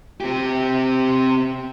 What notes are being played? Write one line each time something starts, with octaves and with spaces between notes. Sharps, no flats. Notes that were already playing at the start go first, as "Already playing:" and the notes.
C4 G4